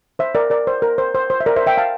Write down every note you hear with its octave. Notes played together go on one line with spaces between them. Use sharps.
C5 E5
A#4 D5
A#4 D5
C5
A#4
C5
C5
C5
E5
A#4 D5
C5 E5
E5 G5
F5 A5